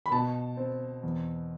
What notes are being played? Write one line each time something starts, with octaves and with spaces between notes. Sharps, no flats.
B5
B2 A5
C4
E2